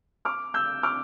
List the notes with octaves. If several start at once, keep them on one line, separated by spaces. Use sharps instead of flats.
D6 F6
E6 G6
D6 F6